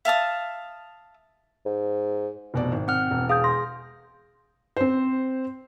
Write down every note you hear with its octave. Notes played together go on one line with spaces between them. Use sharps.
E5 F5 A5 D#6
G#2
F1 B2 D5
G#1
C4 F#5 F6
E1
G#4 F5 D#6 G6
C6 A#6
C4 C5